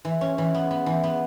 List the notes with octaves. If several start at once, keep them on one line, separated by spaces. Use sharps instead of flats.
E3
C#4
E3
B3
B3
E3
B3